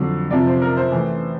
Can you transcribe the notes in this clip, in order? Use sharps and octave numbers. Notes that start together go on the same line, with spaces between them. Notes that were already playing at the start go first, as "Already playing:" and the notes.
Already playing: F2 D3 F#3
F2 C3 F3 D5
C5
A#4
C5
A2 E3